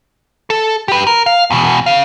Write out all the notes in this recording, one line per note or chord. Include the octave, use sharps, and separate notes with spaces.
A4
G4 B4
A#4
F5
E2 B2
C#3 F5